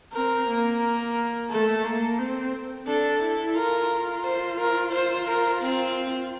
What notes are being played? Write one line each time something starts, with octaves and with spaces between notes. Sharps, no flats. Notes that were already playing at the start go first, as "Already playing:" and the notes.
C4 A#4
A#3
A#4
A3 A4
A#3
C4
D4 A4
E4
F4 A#4
C5
A#4
C5
A#4
C4